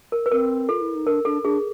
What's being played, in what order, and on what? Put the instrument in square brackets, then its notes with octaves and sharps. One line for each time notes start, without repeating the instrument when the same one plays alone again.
[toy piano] A#4
B4
[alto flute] C4 [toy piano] A#4
[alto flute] F4 [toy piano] A4
[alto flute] E4
D#4
[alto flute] D4 [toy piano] A#4
[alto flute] D4 [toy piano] A4
[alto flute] D4 [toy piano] G#4